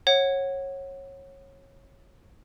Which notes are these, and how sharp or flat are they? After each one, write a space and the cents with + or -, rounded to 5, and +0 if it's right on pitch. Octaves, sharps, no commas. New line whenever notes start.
C#5 -25 F#5 +0